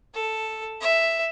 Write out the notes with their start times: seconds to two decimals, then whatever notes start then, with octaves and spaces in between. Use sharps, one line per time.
0.14 A4
0.81 E5